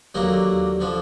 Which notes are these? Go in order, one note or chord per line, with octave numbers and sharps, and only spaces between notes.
D#2 D3 F#3 A#3
D3 F3